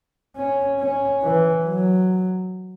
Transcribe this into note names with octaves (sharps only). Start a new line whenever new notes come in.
C#4
C#4
E3
F#3